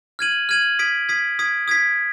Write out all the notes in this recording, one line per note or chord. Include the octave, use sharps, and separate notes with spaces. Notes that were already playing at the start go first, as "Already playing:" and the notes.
F6 G#6 D#7 F#7
F6 G#6 D#7 F#7
D#6 G#6 B6 D7
D#6 G#6 B6 D7
D#6 G#6 B6 D7
D#6 G#6 B6 D7